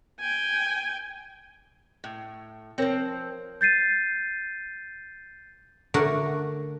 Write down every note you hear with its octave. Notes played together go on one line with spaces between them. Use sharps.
G5 G#5
A2
F3 C4 A#4 C#5
G6 A6 C7 D#7
D3 A3 D4 F#4 A#4